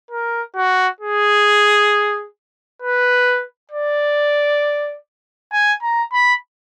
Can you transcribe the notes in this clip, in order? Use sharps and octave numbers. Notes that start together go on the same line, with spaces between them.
A#4
F#4
G#4
B4
D5
G#5
A#5
B5